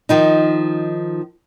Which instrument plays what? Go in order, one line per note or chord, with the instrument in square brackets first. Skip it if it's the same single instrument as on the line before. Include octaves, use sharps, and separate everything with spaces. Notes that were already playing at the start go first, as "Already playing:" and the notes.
[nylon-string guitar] D#3 F3 D#4